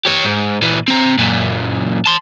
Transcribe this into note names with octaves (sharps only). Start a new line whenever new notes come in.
G4 C#5
G#2
A#2 E3
C4 A#5
F#2 A#2
A5 C6